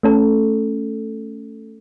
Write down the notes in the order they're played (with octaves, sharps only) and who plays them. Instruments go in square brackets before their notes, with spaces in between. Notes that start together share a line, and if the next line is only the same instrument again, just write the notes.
[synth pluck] A3 C#4 A4